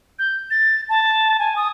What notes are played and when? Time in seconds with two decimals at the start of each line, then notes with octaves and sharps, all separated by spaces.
0.19 G6
0.51 A6
0.89 A5
1.39 G#5
1.56 D#6